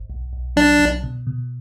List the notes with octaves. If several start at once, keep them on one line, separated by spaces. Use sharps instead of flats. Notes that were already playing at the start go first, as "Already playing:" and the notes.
Already playing: G#1
B1
B1
F#3 D4
B1
B2
B2